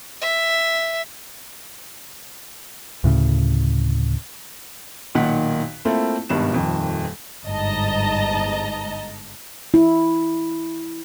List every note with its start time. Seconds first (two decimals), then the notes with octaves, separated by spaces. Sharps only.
0.21 E5
3.04 D2 A2 C#3
5.15 B1 A#2 D#3 F#5 F#6 B6
5.85 A3 A#3 C4 E4 F4 A4
6.29 G#1 G2 B2 E7
6.52 D#1 F2 D#3
7.46 G1 G#2 D#5 A5 A#5
9.74 E4